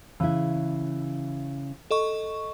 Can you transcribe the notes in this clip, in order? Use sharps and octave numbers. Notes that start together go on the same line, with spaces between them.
C#3 E3 E4
A4 D#5 C#6